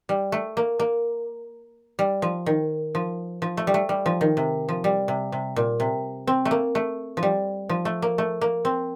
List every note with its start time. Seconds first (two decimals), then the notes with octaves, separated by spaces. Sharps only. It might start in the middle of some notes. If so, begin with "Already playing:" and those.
0.09 G3
0.32 A3
0.57 A#3
0.80 A#3
1.99 G3
2.22 F3
2.46 D#3
2.95 F3
3.42 F3
3.57 A3
3.67 G3
3.74 A3
3.89 G3
4.06 F3
4.21 D#3
4.37 C3
4.69 F3
4.84 G3
5.08 C3
5.32 C3
5.56 A#2
5.80 C3
6.27 C4
6.45 A3
6.51 A#3
6.75 A3
7.17 F3
7.23 G3
7.69 F3
7.85 A3
8.02 A#3
8.18 A3
8.41 A#3
8.65 C4